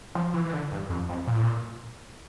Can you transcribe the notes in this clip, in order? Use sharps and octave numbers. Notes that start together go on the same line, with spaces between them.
F3
E3
E3
D3
G2
F2
F2
A#2
A2
A#2